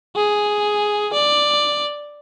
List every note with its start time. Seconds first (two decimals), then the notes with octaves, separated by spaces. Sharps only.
0.16 G#4
1.13 D5